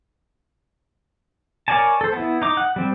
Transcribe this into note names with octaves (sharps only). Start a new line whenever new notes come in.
A#4 C#5 D5 G#5 A5
A4 C5
B3 E4
D#4 D6
F#5
G3 C4